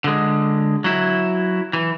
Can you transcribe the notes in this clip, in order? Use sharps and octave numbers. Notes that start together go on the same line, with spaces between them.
D3 G#3
F#3 E4
E3